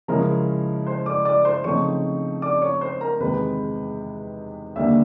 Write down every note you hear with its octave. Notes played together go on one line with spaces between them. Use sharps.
C#3 F3 G#3 C#4 E4 A#4 A#5
C5 C6
D5 D6
D5 D6
C5 C6
C#3 F3 A3 C4 D#4 C#5 C#6
D5 D6
C#5 C#6
C5 C6
A#4 A#5
E2 C3 D#3 G#3 B3 B4 B5
D#2 D3 G3 A#3 E5 E6